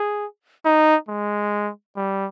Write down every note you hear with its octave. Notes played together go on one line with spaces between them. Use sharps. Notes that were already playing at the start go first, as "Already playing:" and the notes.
Already playing: G#4
D#4
G#3
G3